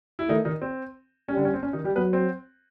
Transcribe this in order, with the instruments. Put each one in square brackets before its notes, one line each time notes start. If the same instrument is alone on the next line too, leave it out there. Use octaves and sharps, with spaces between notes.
[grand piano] E4
[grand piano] D#3 D#4 [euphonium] A3
[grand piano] D#3 D#4
C4
[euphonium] G3 [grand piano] C#4
[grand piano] D3 D4
C#4
C4
C#4
D#3 D#4
G3 G4
[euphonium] F#3 [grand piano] B3 B4
[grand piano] C4 C5